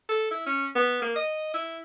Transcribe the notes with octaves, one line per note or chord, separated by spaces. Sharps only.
A4
E4
C#4
B3
A#3
D#5
E4